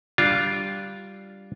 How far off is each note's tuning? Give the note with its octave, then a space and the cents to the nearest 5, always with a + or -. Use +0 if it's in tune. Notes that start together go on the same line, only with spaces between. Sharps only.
G3 -5 D4 +0 F4 +0